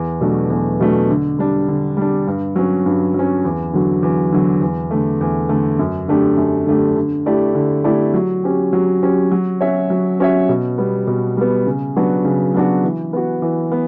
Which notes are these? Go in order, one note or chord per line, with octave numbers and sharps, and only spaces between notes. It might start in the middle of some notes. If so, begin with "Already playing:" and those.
Already playing: E2
B2 F#3 A3 D4
E2
B2 F#3 A3 D4
D3
G3 D4
D3
G3 D4
G2
F#3 C#4
G2
F#3 C#4
E2
D3 F#3
E2
D3 F#3
E2
D3 A3
E2
D3 A3
F#2
D3 A3 D4 G4
F#2
D3 A3 D4 G4
D3
A3 E4 G4 D5
D3
A3 E4 G4 D5
F#3
C#4 G4
F#3
C#4 G4
F#3
C#4 F#4 C#5 E5
F#3
C#4 F#4 C#5 E5
B2
G3 B3
B2
G3 B3
C#3
F#3 B3 D4 F#4
C#3
F#3 B3 D4 F#4
E3
B3 F#4
E3
B3